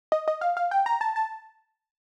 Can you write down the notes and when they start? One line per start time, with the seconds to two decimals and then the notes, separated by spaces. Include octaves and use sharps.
0.12 D#5
0.28 D#5
0.41 F5
0.57 F5
0.71 G5
0.86 A#5
1.01 A5
1.16 A5